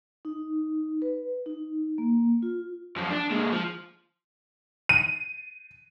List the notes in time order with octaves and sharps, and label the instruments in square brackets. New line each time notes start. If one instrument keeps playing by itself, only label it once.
[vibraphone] D#4
B4
D#4
A#3
F4
[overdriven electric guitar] F#2 F3
D4
A#2 G#3
F3
[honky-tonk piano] D#7